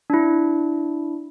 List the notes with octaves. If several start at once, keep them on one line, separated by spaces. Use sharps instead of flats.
D4 E4